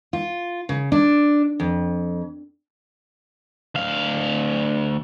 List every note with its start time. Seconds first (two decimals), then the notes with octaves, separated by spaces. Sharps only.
0.13 F4
0.69 C#3
0.92 D4
1.60 F2
3.75 D2 F5